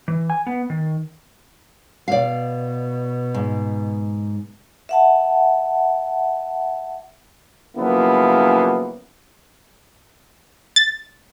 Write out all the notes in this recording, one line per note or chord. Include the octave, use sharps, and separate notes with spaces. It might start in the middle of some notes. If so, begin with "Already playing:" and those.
E3
G#5
B3
D#3
B2 D5 F5
G#2
E5 F#5 A5
C#3 F3 F#3 A#3 B3 E4
A6